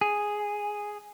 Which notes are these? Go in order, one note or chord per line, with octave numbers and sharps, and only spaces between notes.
G#4